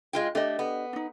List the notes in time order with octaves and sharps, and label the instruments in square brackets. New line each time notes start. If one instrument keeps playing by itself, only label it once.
[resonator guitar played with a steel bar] G#3 F4 G5
[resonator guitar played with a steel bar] A3 [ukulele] D4 G4 D#5
[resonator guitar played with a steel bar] B3
[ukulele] D4 D#4